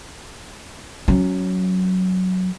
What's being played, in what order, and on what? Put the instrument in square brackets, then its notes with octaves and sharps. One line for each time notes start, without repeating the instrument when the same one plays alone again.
[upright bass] F#3 C#4